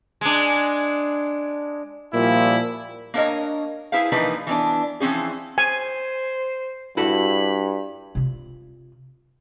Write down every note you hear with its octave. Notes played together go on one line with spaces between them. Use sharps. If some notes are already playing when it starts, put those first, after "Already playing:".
G#3 D4
A#2 F3 G3 E4
A#3 D4 A#4 C#5 D#5
E4 G#4 B4 C5 F5
E3 F3 A#3 D4 D#4 B4
E3 B3 D4
E3 F3 C4 C#4 G#4
C5 G#5
G2 E4 F#4 A4 B5
C3 F4